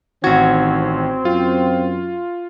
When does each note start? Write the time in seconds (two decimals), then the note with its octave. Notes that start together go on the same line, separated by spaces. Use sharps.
0.24 A1 D#3 C4 F#4 G#6
1.25 F#2 F4